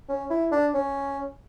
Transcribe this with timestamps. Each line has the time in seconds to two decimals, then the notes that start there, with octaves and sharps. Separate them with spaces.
0.09 C#4
0.30 E4
0.52 D4
0.74 C#4